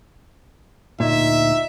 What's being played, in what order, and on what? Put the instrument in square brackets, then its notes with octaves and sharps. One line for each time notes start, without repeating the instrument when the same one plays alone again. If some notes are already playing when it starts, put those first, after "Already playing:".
[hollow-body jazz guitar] D2 A#2 [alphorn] D#4 [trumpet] E5